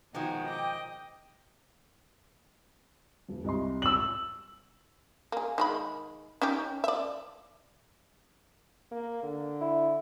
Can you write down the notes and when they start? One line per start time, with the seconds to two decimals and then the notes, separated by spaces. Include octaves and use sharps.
0.15 B2 D#3 F3 G#3 D#4 F#4 G5
0.47 D#5 D6
3.28 E1
3.44 C2 D#5 C6
3.82 E6 F#7
5.32 A#3 G#4
5.58 D#3 G#3 B5
6.42 C#4 D#4 G4
6.84 D5 E5
8.91 A#3
9.23 D3
9.61 E4